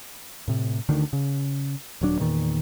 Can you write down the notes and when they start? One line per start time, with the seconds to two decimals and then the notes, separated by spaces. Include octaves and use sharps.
0.48 A2 C3
0.89 D2 D3 D#3 D4
1.13 C#3
2.01 D#1 F#3 D4
2.19 E2 A#2 D#3